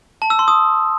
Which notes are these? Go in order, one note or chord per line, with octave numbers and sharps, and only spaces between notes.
A5
E6
C6
D#6